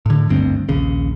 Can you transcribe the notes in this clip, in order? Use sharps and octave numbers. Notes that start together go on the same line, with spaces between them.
A2 D3
G1 D2 G2 C4
A#1 D#2 C#3